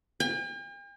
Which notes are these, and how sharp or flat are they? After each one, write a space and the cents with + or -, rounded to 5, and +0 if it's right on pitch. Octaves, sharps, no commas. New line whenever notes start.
G5 +45